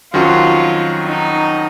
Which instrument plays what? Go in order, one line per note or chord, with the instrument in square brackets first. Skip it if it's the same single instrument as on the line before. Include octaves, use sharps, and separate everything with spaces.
[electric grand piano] F2 D#3 F#3 C#4 F#4 [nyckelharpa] F4
[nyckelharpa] D#4